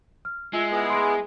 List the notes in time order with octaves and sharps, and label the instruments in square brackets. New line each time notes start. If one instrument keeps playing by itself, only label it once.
[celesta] F6
[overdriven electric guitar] G#3 [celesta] F4 [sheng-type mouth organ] E5
[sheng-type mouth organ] B3 E4 G#4
[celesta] C6 D7